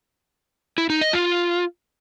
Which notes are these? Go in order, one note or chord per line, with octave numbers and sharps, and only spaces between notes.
E4
D#4
D#5
F4